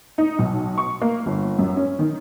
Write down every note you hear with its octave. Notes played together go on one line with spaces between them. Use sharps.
D#4
B1
C#6
A#3
G1
F#2
C#4
D#3